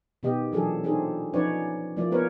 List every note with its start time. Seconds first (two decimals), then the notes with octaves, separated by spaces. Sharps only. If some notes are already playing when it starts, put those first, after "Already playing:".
0.23 B2 D#3 B3 G4 D#5
0.52 A#2 E3 F#3 D4 G#4 A4
0.84 C4 D4 D#4 G#4 A4
1.33 F3 C#4 D#4 B4 C#5 D5
1.97 F3 A#3 E4 D5
2.11 A#3 B3 A#4 B4 C#5